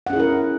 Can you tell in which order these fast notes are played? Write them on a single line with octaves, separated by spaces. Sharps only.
F#5 C#4 G#4 E4 A#4